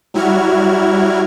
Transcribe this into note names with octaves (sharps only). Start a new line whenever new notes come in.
F#3 G3 E4 F#4 F6 G#6